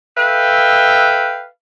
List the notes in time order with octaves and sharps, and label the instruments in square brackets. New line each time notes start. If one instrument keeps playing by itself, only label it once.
[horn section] A4 B4 E5 F5 G5